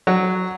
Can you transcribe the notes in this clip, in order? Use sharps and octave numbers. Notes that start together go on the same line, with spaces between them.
F#3